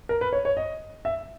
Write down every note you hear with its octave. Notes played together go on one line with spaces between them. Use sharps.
A#4
B4
C#5
C#5
D#5
E5